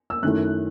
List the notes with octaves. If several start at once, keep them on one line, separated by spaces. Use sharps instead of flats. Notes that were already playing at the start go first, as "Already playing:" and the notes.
E6
F#2 D#3 A3 E4 F#6